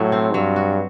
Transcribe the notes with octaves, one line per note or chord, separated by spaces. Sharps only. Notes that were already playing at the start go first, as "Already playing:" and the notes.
Already playing: A2 F#3 F#4
C4
G2 F#3
F#4